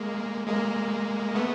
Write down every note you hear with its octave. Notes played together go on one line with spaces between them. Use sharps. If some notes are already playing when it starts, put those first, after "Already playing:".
Already playing: G#3 A#3
G#3 A#3
A3 B3